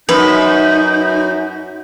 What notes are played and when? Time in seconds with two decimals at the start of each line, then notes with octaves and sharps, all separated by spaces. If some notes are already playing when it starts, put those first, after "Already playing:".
0.09 F#2 D#4 B4 G6